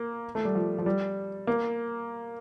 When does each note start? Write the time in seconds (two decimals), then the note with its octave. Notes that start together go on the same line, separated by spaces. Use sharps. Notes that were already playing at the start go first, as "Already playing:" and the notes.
Already playing: A#3
0.35 A3
0.45 G3
0.55 F3
0.78 F3
0.86 G3
1.47 A#3